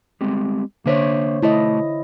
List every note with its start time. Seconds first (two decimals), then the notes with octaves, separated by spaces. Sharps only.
0.21 G3 G#3 C4
0.86 D3 A#3 D4 C5 C#5 E5
1.42 B1 A3 E4 D#5 A5